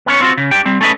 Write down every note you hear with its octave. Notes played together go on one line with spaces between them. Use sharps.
B3 C#4 C#5
C4 F4 F#4
C#3
D4 G4 G5
G3 C4
A3 C#4 A4 B4 D#5